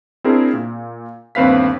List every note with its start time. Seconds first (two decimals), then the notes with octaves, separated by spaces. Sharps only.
0.24 C4 D4 E4 G#4 A#4
0.53 A#2
1.35 G1 D#2 C4 B4 F5 B6